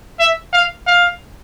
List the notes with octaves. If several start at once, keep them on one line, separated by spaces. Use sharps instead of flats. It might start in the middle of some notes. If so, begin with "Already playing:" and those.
E5
F5
F5